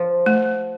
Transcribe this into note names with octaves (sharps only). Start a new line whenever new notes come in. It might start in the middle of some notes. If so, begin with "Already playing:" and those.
Already playing: F3
A3